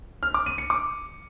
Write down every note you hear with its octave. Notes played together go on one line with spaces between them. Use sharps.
F6
D6
D#7
C#7
D6